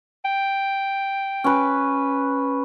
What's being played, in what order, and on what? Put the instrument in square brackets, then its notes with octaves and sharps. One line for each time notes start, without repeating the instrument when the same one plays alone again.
[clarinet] G5
[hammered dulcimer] C#4 B4